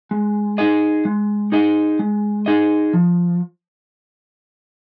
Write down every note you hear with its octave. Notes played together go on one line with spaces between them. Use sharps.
G#3
D#4 G#4 D#5
G#3
D#4 G#4 D#5
G#3
D#4 G#4 D#5
F3